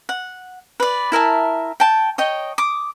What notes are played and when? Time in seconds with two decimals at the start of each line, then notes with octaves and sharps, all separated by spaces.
0.09 F#5
0.80 B4 D5
1.12 E4 A#4 E5 A5
1.80 G5 A5
2.18 C#5 D#5 G5
2.58 D6 D#6